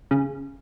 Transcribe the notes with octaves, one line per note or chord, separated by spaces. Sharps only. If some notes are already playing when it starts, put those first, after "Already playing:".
C#3